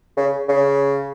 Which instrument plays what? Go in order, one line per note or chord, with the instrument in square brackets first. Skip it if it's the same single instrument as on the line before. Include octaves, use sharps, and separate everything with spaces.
[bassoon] C#3
C#3